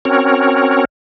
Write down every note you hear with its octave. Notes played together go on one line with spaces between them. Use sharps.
C4 C#4 F#4 A#4 C#5